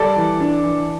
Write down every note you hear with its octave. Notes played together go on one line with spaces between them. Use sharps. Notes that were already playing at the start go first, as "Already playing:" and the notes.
Already playing: G3 A4 D5
E3
D4
E3